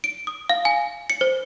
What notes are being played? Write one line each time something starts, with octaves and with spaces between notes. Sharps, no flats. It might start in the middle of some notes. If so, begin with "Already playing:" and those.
D7
D#6
F5
G#5
C#7
C5